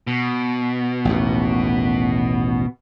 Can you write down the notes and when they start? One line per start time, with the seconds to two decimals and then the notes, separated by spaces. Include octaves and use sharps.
0.07 B2
1.05 A1 D#2